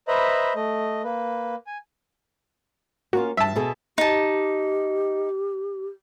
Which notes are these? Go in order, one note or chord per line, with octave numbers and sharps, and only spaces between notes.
B4 C5 D#5 E5 A#5 B5
A3 D#5
A#3 B4
G#5
A#3 C#4 F4 F#4
G2 E5 A5
B2 G#4 A4
D#4 G4 A5